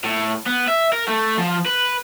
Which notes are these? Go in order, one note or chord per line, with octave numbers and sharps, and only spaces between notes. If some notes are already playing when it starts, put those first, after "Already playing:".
A2
B3
E5
A#4
A3
F3
B4